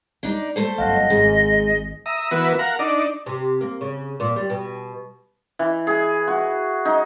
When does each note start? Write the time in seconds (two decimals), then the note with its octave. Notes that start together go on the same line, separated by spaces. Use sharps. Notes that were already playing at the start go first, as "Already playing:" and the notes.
0.23 G#3 D4 D#4 D5
0.56 A3 A4 C5
0.78 G1 F#2 D#5 F5 F#5
1.10 G#1 G#2 G#4
2.06 E5 A#5 D#6
2.31 E3 B3 F#4 A#4 B4 E5
2.59 A#4 F5 F#5 A#5
2.79 D4 D#4 D5
3.26 C3
3.61 A#3
3.81 C#3
4.20 A#2
4.36 G3
4.50 B2
5.59 E3
5.87 G#4
6.27 F#4
6.85 D#4